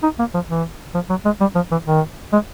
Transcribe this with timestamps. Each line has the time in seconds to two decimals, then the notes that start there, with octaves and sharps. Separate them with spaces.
0.03 D#4
0.19 A#3
0.34 F3
0.49 E3
0.94 F3
1.10 F#3
1.25 G#3
1.40 G3
1.55 F3
1.71 E3
1.87 D#3
2.33 G#3